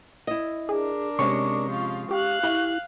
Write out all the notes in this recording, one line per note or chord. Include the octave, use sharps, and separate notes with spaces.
E4 D#5
D4 G#4 A#4
C3 G#3 C#4 C#6
F3 F4
G4 F5 F#6
E4 G4